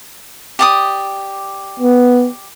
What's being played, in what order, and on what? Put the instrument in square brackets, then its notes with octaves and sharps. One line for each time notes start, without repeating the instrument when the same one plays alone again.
[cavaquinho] G4 D5 D#6
[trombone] B3